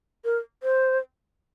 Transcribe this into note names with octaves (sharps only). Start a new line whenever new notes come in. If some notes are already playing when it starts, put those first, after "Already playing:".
A#4
C5